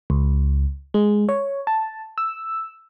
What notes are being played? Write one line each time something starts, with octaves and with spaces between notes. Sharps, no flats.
C#2
G#3
C#5
A5
E6